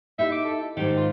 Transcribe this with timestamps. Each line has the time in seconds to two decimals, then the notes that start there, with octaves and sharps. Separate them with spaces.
0.19 D#4 E4 G4 E5
0.32 D6
0.45 A4
0.77 G#2 D#3 G4
0.97 F4